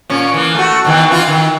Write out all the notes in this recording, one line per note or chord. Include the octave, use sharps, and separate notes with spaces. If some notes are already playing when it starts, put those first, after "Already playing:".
A#2 C#4
E3 A#3
A3 F#4
B2 D#3 E3
E3 E4 F4
D#3